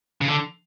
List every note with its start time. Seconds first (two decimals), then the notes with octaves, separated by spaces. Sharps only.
0.21 C#3
0.28 D3